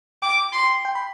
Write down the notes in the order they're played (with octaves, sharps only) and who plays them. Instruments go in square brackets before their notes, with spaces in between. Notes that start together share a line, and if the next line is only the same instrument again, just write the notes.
[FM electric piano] G5 [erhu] D6
[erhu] C6
[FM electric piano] G5
B5